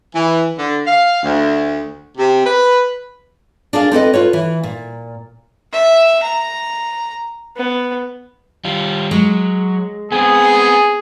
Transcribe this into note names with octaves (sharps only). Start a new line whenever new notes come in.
E3
D3
F5
D2
C3
B4
D4 G#4 A#4 F5
C4 A4 B4 D#5
F4 B4 C#5
E3
A#2
E5
A#5
B3
G3 F4
F#3 G#3
B3 C4 G#4 G#5